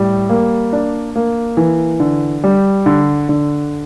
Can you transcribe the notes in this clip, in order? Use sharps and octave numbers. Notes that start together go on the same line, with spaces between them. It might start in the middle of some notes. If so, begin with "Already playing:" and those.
Already playing: A2 G3
A#3
D4
A#3
E3
D3
G3
D3
D3